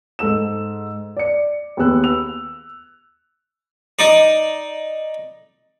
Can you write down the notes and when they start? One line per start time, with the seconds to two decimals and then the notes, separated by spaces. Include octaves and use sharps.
0.19 G#2 A4 E6 E7
1.17 D5 C#7
1.77 D#2 B3 G#4 E6 F#6
2.03 E6 F7
3.99 D#4 D5